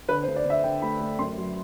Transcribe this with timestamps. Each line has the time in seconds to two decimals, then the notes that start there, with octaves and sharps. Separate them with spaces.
0.09 D3 B4
0.23 C5
0.27 D2
0.36 D5
0.45 D2 E5
0.64 D3 G5
0.82 A3 B5
1.00 A3
1.19 F#2 C6
1.37 F#3